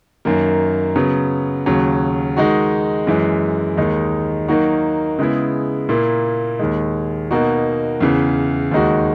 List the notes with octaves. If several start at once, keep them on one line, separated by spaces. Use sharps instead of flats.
F#2 D#3 A#3
C#3 F#3 B3
D#2 C#3 F#3
D#3 G#3 D#4 F#4
F#2 E3 G#3
D#2 D#3 G#3 D#4
D#3 F#3 A#3 D#4 F#4
C#3 G#3 B3 E4
A#2 A#3 E4
D#2 D#3 G#3
B2 A#3 D#4 F#4
E2 C#3 E3
D#2 D#3 G#3 D#4 F#4